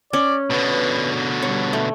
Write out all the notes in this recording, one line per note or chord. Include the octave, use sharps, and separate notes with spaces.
C#4 D5
B2 D3 B4
G3 C#5
A3